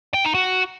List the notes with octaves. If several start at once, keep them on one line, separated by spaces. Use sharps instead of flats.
G5
D#4
F#4